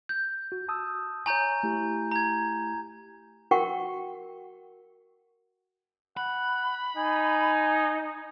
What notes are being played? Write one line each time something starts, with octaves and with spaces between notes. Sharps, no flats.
G6
F#4
A5 D#6 E6
C#5 G#5 A#5 C#6 G6
A3 E4 G4
A#5 G#6
F#4 A#4 F#5 G5 C#6
F#5 B5
D#4 G#5